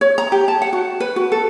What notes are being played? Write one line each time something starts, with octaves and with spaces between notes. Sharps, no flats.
C#5
A#5
G4
A5
F#5
F#4
B4
F#4
A4